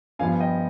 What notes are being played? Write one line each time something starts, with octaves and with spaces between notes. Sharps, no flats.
G2 F3 B3 F4 F5 G#5
D#5 G5